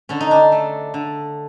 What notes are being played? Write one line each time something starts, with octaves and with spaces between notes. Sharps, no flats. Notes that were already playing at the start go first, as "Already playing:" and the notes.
D3 C#4
D#4
D4
A3
D3